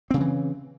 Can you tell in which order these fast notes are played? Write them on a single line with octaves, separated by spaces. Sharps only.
C4 C#3 G3 E3